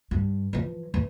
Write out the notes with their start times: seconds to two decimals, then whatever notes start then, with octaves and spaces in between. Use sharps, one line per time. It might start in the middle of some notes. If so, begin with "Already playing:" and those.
0.11 G2
0.53 E3 F3
0.94 E3